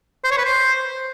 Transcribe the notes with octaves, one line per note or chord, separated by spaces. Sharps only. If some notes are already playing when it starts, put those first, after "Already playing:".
C5
C#5
B4
C5